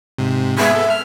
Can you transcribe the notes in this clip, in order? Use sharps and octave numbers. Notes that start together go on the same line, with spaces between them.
G#2 C3
G#3 B3 G#4 E5
B3 A4
F6